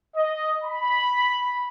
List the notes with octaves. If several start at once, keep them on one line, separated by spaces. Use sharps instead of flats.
D#5
B5